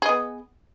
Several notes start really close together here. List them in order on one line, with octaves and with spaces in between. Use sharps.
G#4 D#5 B3